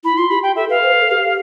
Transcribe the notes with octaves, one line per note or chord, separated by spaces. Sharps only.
E4 B5
F4 C6
G4 B5
G4 G5
A4 E5
B4 F5
C5
B4
A4
G4